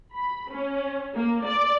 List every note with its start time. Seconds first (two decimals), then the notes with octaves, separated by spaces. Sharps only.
0.15 B5
0.51 C#4
1.15 A#3
1.46 D5